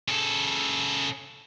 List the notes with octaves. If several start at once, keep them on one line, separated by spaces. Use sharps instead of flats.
C#3 A4